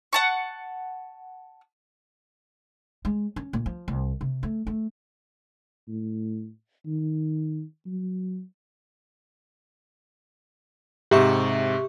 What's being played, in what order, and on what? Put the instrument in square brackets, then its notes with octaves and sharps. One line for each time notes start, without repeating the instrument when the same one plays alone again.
[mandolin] F#5 A5 C#6
[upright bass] G#3
C#4
A#2
F3
C2
C3
A3
A3
[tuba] A2
D#3
F#3
[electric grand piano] G#2 C3 [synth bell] G4 E5 C#6